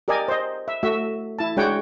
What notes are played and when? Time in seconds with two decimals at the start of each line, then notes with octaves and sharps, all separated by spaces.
0.08 G4 A#4 D5 D#5 G#5
0.28 C5 D#5
0.68 E5
0.83 A3 F#4 E5
1.39 E4 A5
1.57 G#3 D4 F#4 C#5 F#5 G5